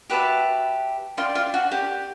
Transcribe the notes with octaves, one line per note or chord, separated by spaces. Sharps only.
F#4 G4 B4 E5 A5
F4 D5 G5 C6
F4
F#4
G4